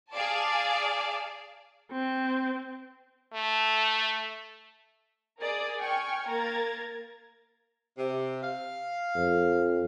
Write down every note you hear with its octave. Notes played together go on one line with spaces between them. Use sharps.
G#4 D5 F5 A5
C4
A3
G#4 A#4 D5 D#6
G5 G#5 C#6 F6 G#6
A#3 A#4 A#5 G#6 A6
C3
F5
F2